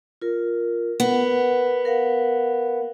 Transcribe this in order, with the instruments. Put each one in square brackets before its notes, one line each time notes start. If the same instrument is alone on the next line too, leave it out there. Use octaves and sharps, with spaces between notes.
[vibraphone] F4 A#4
[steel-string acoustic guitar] B3 [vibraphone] A#4 F#5
[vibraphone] A#4 F5 F#5